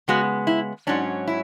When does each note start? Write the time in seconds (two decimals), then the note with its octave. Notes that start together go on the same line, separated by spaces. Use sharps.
0.08 C#3 G#3 B3 F#4
0.47 E4
0.87 G#2 F#3 C#4 D4
1.28 E4